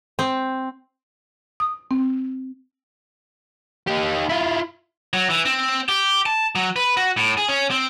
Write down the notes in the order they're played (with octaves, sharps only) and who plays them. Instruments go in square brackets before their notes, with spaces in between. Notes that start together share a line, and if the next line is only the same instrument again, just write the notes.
[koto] C4
[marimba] D#6
C4
[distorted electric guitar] D#4 G4
E4 F4
[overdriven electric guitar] F#3
E3
C4
G4
A5
F#3
B4
F#4
A2
G#4
C#4
C4